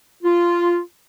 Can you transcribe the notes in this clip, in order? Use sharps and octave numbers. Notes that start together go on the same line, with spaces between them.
F4